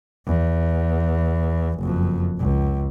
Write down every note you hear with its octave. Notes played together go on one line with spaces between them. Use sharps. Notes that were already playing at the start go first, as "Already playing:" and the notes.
E2
F#1 F2
C#2